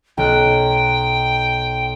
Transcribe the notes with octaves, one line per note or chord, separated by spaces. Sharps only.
B1 G5 F#6